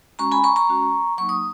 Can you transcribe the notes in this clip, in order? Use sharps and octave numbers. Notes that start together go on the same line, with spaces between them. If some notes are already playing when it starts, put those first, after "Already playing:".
G#3 C#4 F#4 A#5 C#6
G#5 B5
A#5 C#6
A#5 C#6
G#3 C#4 F#4
F#3 A#3 D#4 C#6
D#6